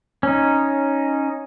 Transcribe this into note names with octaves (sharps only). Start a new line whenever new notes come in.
C#4 D#4